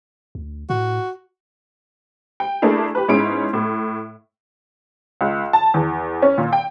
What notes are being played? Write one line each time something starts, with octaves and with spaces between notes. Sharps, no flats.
D2
A2 F#4
G5
A3 A#3 D4 E4 G#4
G4 B4
G#2 B3 C#4 E4 G#4 D7
A2
C#2
A5
E2
C#4
A#2
G5